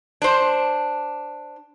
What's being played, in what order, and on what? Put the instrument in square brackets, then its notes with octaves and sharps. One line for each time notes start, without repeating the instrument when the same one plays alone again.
[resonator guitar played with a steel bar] D4 C5